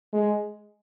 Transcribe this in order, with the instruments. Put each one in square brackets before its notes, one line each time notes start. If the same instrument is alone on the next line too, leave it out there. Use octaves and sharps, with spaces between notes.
[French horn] G#3